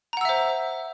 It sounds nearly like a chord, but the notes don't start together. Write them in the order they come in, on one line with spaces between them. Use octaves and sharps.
A#5 F#5 E6 E5 C5